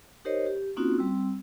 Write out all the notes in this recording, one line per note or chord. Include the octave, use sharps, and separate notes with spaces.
D#4 G4 A#4 C5 C#5 D#5
G4
A#3 C4 C#4 D#4 F4 F#4
G3 C4 E6